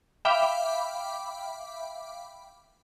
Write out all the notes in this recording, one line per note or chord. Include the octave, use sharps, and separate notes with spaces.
E5 F5 G5 B5 D6